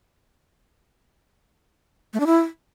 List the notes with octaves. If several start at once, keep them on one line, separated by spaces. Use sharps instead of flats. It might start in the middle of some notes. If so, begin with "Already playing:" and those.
A3
D4
E4